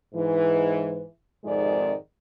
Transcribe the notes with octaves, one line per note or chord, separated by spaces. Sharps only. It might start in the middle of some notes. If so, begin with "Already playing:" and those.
G#2 E3
F2 G#2 C3 D#3 G#3 D5